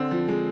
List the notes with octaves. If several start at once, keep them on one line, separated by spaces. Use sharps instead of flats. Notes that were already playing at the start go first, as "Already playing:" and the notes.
Already playing: D3 C4
F3
G#3